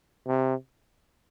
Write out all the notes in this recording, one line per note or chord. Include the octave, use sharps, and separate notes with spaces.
C3